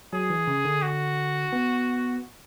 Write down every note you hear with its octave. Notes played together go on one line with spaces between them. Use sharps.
F#3 G#4
E3
C#3
D3
F#4
B3